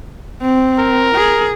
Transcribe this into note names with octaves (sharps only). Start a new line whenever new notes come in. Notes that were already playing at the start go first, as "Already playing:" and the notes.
C4
A#4
G#4